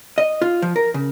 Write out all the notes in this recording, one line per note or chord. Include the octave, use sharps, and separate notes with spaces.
D#5
F4
F3
A#4
C#3